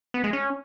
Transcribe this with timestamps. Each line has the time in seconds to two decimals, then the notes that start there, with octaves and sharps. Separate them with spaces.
0.14 B3
0.24 G#3
0.33 C#4